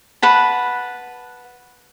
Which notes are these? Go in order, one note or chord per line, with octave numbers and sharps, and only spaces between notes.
B4 F#5 A5